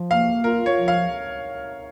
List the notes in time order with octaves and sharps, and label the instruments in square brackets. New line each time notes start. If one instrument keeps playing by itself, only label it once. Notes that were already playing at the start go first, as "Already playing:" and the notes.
Already playing: [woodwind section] F3
[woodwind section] A#3 [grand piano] F5
[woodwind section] F4 [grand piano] A#4
[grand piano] C#5
[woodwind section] F3
[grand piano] F5